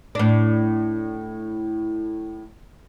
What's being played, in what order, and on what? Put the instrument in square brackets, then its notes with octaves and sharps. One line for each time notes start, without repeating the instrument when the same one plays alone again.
[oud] A2 D4